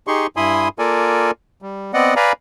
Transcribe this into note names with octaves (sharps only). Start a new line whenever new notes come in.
D#4 G4 G#4 C6 C#6
G2 E4 G#5 B5 C6 D#6
A#3 F4 A4 A#4 D5 G#5
G3
B3 C4 D5 D#5 F#5
B4 D5 F5 G#5 A#5 B5